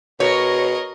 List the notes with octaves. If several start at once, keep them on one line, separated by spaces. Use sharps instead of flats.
B2 A#4 C#5 D#5